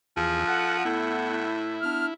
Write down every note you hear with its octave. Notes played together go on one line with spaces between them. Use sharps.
E2 F3 G#4
A4 F#5
A2 B3 E4 A4 F#5
B3 D4 F6